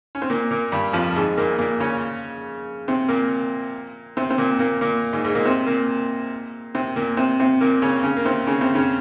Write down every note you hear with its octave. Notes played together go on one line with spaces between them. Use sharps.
C#4
C4
A#2 A#3
A#2 A#3
G2 G3
F2 F3
G#2 G#3
A#2 A#3
A#2 A#3
C#3 C#4
C3 C4
A#2 A#3
C3 C4
C4
A#2 A#3
A#2 A#3
A#2 A#3
G#2 G#3
G#2 G#3
A#2 A#3
C3 C4
A#2 A#3
C3 C4
A#2 A#3
C3 C4
C3 C4
A#2 A#3
C#3 C#4
C#3 C#4
A#3
C3 C4
C#3 C#4
C3 C4
C#3 C#4